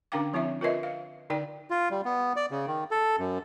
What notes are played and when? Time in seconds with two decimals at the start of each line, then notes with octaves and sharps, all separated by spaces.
0.12 D3 C#4 D4 F5 G5 D6
0.34 F3 C4 E4 C#5 E5
0.61 F4 A#4 B4 C#5 D#5 E5
0.83 F5
1.30 D3 D#4 D5 G5
1.70 F4
1.90 G3
2.05 B3
2.36 D5
2.51 C#3
2.67 D#3
2.91 A4
3.19 F#2